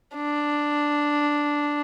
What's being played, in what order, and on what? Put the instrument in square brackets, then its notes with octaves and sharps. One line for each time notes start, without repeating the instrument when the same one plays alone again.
[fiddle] D4